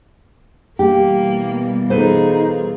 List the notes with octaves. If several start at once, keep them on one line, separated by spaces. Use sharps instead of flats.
B2 E3 G3 A#3 G4
D#4 F4 G#4 A4 B4 C5